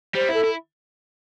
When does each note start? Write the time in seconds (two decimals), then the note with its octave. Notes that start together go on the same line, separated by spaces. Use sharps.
0.15 G3 C5
0.29 E4 A4
0.44 E4